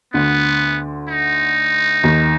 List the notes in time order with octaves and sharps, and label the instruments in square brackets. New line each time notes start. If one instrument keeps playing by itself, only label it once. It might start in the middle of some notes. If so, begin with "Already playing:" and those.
[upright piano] D2 D3 [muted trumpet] B3
[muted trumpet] D#4
[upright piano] D#2 D#3